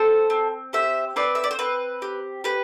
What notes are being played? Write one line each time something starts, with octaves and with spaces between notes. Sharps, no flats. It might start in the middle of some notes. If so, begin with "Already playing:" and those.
Already playing: C4 A4 C5
C4
G4 C5 E5
C4 B4 D5
E5
D5
C5
C4 B4
G4
G4 B4